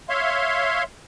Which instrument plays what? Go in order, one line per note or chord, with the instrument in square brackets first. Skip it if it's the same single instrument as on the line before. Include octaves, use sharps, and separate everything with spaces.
[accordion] C#5 E5 F5 C6